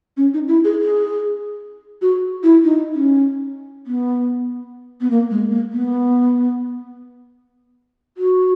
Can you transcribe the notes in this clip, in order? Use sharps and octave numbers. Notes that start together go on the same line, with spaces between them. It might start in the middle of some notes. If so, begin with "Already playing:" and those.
C#4
D#4
E4
G#4
G#4
F#4
E4
D#4
C#4
B3
B3
A#3
G#3
A#3
B3
F#4